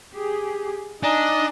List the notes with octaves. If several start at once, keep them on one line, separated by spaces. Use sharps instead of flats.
G4 G#4
D4 D#4 D#5 G#5 A#5